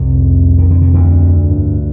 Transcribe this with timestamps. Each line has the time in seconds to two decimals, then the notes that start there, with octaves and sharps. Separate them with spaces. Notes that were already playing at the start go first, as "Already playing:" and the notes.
Already playing: C2 F2 C3
0.58 D#3
0.71 D3
0.82 C3
0.94 D2 D3
1.50 G2